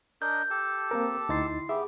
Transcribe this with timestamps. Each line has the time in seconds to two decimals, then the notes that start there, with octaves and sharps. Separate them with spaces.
0.22 D4 A#4 D#5 G6
0.50 G4 A4 A5
0.91 A#3 C4 A#4
1.29 D2 D#4 E4 C6 A6 C7
1.69 B3 G4 G#4 E5